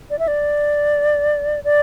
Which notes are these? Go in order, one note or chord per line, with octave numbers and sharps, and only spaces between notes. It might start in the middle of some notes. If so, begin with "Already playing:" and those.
D5
E5
D5
D5